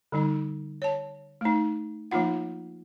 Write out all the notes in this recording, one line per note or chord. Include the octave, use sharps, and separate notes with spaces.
D3 G3 D#4
C#5 A5
A3 D#4
F3 A#3 D#4 F4 F#5